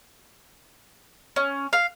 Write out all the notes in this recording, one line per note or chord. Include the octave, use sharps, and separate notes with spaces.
C#4
F5